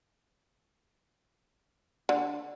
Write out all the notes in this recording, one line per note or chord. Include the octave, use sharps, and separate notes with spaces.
D3